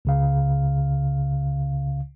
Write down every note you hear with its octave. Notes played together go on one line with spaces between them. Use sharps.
C#2 C#3 F5